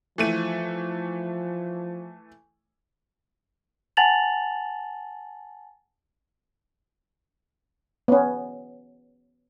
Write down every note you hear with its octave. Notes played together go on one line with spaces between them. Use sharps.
E3 F3 A3 D#7
F#5 G#5 A5 A6 F7 F#7
B3 C#4